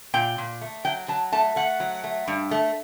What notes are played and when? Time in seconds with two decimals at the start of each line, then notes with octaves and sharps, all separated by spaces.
0.14 A#2 G5
0.38 A#2
0.61 A3
0.85 F#3 G5
1.08 F#3 A5
1.32 A3 A5
1.56 A3 F#5
1.80 F#3
2.04 A3
2.28 G2
2.51 A3